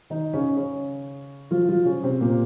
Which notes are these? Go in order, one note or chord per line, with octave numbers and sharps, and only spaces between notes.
D#3 D#4
C#3 C#4
C#3 C#4
F3 F4
F3 F4
C#3 C#4
C3 C4
A#2 A#3